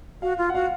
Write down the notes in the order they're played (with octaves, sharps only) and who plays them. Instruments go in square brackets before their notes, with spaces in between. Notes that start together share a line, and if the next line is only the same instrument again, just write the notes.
[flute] F#4 [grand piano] F5
[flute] F4
[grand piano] F#5
[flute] F#4 [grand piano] F5